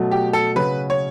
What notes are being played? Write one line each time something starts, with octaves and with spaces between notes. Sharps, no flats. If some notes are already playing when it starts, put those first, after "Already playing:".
Already playing: B2 F#3 A3
G4
A4
C#3 F#3 C#4 F#4 B4
C#5